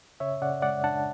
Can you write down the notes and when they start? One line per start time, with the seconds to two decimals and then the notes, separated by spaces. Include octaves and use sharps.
0.20 C#3 C#5 E5
0.42 C#3 D5 F#5
0.62 G#3 D5 F#5
0.84 D4 F#5 A5